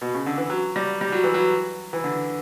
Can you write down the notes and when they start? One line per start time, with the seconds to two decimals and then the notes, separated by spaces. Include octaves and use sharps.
0.01 B2
0.14 C#3
0.26 D3
0.37 E3
0.50 F#3
0.76 G3
1.01 G3
1.12 F#3
1.24 E3
1.34 F#3
1.93 E3
2.04 D3